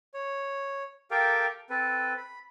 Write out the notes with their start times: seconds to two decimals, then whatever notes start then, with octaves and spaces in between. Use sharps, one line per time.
0.14 C#5
1.11 G4 A4 A#4 F5 G5
1.70 C4 A4 B4
2.17 B5